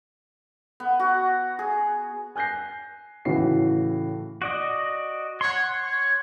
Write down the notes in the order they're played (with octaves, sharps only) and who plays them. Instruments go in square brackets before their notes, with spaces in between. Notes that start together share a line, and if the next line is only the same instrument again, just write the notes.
[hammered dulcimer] B3
F#4
G#4
[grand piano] G#5 F#6 G6 A#6 C7
A2 C#3 E3 F#4 C7
[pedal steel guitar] F#4 D5 D#5
[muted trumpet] C#5 [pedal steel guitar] F#5 C6
[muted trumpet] C#5